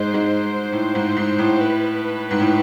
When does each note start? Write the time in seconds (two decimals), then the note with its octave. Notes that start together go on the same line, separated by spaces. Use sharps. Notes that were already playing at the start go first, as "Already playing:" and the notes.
Already playing: G#2 G#3 C5
0.14 G#2 G#3
0.72 A2
0.95 G#2
1.17 G#2
1.38 A2
1.61 B4
2.31 G#2
2.39 A2